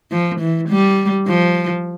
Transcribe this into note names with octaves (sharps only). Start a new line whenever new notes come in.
F3
E3
G3
F3